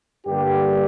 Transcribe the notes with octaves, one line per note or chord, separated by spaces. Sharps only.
G2 D3 G3 A#3 G4